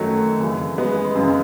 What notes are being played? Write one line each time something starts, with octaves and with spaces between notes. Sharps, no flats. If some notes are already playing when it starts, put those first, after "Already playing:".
Already playing: F#2 D#3 F#3 A3
F#2 C#3 E3
G#3 B3
F#2 C#3 E3